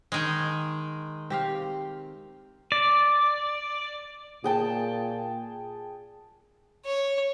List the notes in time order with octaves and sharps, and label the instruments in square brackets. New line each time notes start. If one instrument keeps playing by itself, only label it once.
[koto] D#3 G#3
[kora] C4 G4 F5
[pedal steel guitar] D5
[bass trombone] A#2 [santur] G#4 G5 A5
[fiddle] C#5